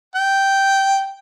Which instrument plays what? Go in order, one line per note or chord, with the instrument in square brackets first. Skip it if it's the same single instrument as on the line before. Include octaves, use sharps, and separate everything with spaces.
[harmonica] G5